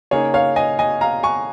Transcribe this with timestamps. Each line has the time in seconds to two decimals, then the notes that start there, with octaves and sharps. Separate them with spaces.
0.11 C#3 A#3 D#4 G#4 C#5
0.34 C#5 F5
0.56 D#5 G#5
0.79 D#5 G#5
1.01 F5 A#5
1.23 G#5 C#6